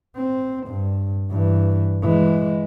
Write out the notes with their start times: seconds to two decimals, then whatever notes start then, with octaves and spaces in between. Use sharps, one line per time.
0.16 C4
0.67 G2
1.31 G2 E3
2.02 E3 G#3